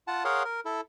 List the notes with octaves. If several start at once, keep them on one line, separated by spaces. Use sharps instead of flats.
F4 F#5 A5
G#4 A#4 C#5 F5 F#5 C6
A#4
E4 A4